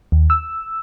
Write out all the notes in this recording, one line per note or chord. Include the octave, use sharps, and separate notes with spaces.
D#2
E6